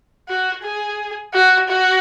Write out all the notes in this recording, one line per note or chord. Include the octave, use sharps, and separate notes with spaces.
F#4
G#4
F#4
F#4